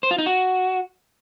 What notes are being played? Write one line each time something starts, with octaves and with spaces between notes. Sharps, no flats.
C5
F4
D#4
F#4